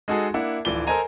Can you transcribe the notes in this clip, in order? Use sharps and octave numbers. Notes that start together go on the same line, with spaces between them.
G#3 D#4 F#4 G#4 A4
A#3 D4 E4 F#5
D1 E3 F3 D5 G7
A4 A#4 C5 D#5 G#5 A#5